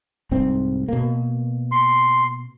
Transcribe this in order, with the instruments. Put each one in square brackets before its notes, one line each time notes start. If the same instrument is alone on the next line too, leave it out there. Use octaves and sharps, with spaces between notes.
[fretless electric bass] C2 G#2 C4
B2 A#3
[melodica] C6